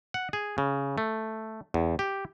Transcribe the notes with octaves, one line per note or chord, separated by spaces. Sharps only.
F#5
G#4
C#3
A3
E2
G4